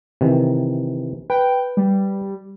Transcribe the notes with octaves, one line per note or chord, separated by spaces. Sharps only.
C3 D#3 E3
B4 G5
G3